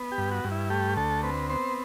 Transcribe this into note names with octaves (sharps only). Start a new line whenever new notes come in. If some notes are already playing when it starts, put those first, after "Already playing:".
Already playing: B3
G4
G2
F#4
G2
E4
A3 G4
D2 A4
C4 B4
B3 C5